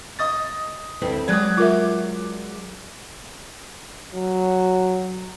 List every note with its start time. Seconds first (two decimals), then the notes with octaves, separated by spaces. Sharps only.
0.19 D#5 D#6 A6
1.02 D2 C4 E4 B4
1.28 F#3 G#3 D5 D#6 F#6 G#6
1.57 F4 A#4 E5 D6
4.14 F#3